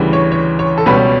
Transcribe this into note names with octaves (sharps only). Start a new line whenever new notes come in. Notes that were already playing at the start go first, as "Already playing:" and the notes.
Already playing: D2 C#3 E3 G3
C#5
C#5
C#5
A4
C#2 B2 G3 C#4 B4